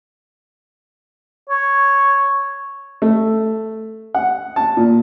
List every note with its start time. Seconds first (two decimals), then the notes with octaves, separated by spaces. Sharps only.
1.50 C#5
3.02 A3
4.14 F#5
4.56 A5
4.77 A#2